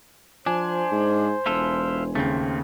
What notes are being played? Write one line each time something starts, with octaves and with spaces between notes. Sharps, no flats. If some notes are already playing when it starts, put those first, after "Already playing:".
F3 D4 C5 G#5
G#2
E1 E4 F4 A4
D#2 C#3 A3 C4